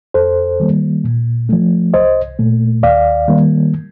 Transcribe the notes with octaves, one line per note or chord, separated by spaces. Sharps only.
F2 A4 C5
D#3 G3 A#3
A#2
F3 A3
C2 C5 D#5
A#2 A3
D#2 D5 F5
D#3 G3 A#3